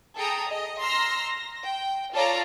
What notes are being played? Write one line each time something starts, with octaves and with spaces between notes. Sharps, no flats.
G#4 A4 G5 A#5 D#6
D#5
A#5 C6 E6 F6 A#6
A#6
G5
F4 A4 C#5 D5 A#5